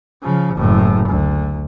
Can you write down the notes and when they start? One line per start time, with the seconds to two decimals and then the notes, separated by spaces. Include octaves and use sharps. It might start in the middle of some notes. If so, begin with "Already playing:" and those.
0.23 C#3 F3
0.56 F#1 A2
1.09 D2